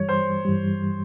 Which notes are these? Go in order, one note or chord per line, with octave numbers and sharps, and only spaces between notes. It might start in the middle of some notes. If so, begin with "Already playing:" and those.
Already playing: G2 E3 G3 C#5
C5
G2 E3 G3